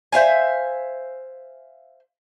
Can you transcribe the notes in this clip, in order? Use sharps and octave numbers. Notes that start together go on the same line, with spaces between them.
C5 E5 F5 G#5